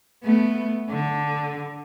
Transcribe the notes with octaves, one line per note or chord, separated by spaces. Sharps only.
A3 B3
D3